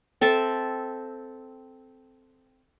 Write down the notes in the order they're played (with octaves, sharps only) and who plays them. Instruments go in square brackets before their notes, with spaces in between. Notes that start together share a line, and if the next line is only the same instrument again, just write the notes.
[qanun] C4 A4 E5 A5